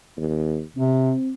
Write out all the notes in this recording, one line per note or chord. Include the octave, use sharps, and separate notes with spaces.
D#2
C3 C4